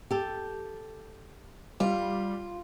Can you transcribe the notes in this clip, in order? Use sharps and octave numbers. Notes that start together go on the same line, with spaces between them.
G4 A4
G3 F4